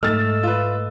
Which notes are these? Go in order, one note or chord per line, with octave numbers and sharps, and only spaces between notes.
G#2 A3 A4 D#5 E6 F6 A6
F4 B4